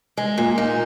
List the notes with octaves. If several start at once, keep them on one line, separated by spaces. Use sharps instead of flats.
G#3
A#2
D#4